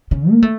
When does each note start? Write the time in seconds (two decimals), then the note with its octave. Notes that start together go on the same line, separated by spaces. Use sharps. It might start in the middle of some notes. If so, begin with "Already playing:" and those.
0.11 C#3
0.31 A#3
0.43 A3